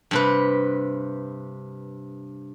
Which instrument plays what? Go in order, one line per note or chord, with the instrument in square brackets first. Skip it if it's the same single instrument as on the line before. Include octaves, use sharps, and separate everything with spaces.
[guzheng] G2 C3 B4